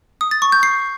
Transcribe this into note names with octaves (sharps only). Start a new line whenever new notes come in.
D#6
A6
C#6
G6
C7